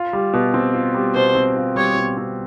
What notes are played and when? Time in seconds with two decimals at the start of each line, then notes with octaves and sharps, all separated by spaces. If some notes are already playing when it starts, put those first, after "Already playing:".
Already playing: F4
0.13 G3
0.33 B2
0.54 C4
0.74 F4
0.94 G3
1.14 B2 C5
1.35 C4
1.56 F4
1.76 G3 C#5
1.97 B2
2.17 C4